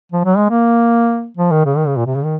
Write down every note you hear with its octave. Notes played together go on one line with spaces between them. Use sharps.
F3
F#3
G#3
A#3
F3
D#3
C#3
D#3
C#3
A#2
C3
C#3
D#3